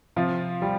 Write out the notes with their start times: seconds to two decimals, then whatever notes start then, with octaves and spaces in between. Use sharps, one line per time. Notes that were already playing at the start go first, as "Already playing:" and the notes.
0.16 C3 F3 F4
0.62 G3